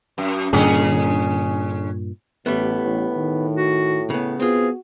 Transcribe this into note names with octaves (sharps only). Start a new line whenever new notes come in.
F#2
G2 A#2 D3 C#4 G#4
A1 A2 G3 A3 B3
A1
D#3
F#4
C#3 B3
B3 C4 F4 F#4 G#4